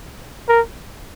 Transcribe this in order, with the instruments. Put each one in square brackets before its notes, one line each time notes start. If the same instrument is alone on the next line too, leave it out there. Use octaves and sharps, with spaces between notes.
[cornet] A#4